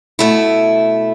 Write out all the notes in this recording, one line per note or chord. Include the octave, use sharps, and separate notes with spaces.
B2 A3 E4